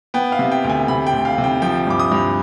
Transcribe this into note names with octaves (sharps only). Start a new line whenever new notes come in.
B3 G5
F5
C3
G5
D2
G#5
C3 B5
G5
D2
F5
C3
G5
F3 G5
G2 D6
D#6
G2